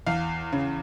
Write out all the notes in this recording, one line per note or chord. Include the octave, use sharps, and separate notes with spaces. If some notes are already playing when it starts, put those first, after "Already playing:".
E2 F5
C#3